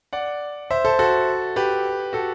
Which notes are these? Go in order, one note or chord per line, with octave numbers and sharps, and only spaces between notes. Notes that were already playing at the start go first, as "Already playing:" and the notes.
D5 F#5
C5 E5
A4 C5
F#4 A4
G4 B4
F#4 A4